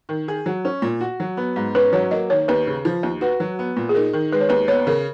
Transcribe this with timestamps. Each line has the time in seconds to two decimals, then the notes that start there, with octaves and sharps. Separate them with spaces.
0.09 D#3
0.28 G#4
0.46 F#3
0.65 C#4
0.82 A#2
1.01 F#4
1.20 F#3
1.37 B3
1.56 G#2
1.75 C#4 B4
1.93 F#3 C#5
2.11 A#3 D#5
2.30 D#3 C#5
2.48 D#2 B4
2.67 C#3
2.85 F3
3.03 D#2
3.21 F#4 B4
3.40 F#3
3.59 B3
3.77 A#2
3.89 G#4
3.95 D#4 A#4
4.13 D#3
4.32 G#3 B4
4.41 C#5
4.49 D#2 B4
4.68 B3 C#5
4.87 C#3 A#4